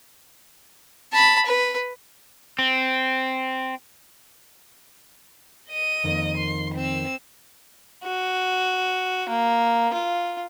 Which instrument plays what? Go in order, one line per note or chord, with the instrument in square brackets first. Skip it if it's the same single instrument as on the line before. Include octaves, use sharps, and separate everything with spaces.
[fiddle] A5 B5
B4
[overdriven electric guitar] C4
[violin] D#5 D#7
[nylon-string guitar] F2 D#3 A#3
[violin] C6
C4 E6
[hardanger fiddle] F#4
A#3
F4